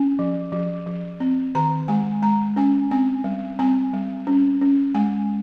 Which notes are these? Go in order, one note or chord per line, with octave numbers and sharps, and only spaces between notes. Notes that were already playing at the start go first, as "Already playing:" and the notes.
Already playing: C#4 G#5
F3
F3
F3
C4
D#3 A#5
G#3 G#5
G#3 A#5
C#4 G#5
C4 G#5
G3
C4 G#5
G3
C#4
C#4
G#3 G#5